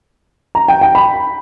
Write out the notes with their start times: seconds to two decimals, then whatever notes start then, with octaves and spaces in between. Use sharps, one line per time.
0.55 A#5
0.68 G5
0.81 G5
0.95 B5